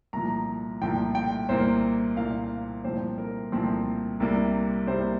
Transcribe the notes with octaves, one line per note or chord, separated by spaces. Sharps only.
C2 A#2 F3 A#5
C2 A#2 F3 G5
G5
C2 A#2 A#3 C5
C2 A#2 A#3 F5
C2 A#2 F3 C4 C5
A#4
C2 A#2 F3 C4
C2 C3 G3 A#3
C2 C3 G3 A#3 C5